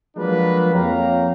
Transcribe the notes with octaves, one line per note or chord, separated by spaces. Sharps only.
F3 F#3 G#3 A#3 D4 B4
F2 A#3 C#5 F5 G5 A#5